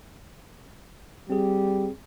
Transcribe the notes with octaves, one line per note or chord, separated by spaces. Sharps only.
G3 C4 G#4